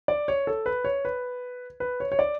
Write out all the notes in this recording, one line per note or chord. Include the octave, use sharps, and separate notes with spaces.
D5
C#5
A4
B4
C#5
B4
B4
C#5
C#5
D5